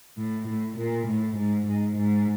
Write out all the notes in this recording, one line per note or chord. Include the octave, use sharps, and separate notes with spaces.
A2
A2
A#2
A2
G#2
G#2
G#2